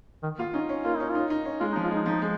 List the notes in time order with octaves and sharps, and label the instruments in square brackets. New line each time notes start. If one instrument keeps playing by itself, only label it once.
[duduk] D#3
[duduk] A#3 [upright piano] F4
[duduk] C#4 [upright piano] D#4
[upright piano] C#4
[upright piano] A#3 [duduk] F4
[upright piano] C#4 [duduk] D#4
[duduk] F4
[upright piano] D#4
D#4
C#4
[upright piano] G#3 [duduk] F4
[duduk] D#4
[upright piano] F3
[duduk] F4
[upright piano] G#3 [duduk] D#4
[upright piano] F3 [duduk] D#4
[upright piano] G#3